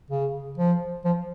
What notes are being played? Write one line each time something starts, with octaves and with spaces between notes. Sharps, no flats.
C#3
F3
F3